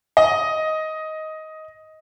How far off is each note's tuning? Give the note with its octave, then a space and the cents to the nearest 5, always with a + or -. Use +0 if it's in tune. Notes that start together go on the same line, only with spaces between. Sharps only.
D#5 +10